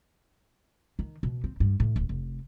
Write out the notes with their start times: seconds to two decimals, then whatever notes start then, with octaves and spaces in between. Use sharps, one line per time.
0.99 D#3
1.23 B2
1.44 C4
1.60 G2
1.80 A2
1.96 D1
2.09 F1